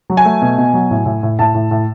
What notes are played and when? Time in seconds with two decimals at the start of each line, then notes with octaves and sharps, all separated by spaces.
0.10 F#3
0.17 G#5
0.25 A3
0.42 B2
0.58 B2
0.74 F#3
0.91 A2
1.06 A2
1.23 A2
1.39 A2 A5
1.54 A2
1.71 A2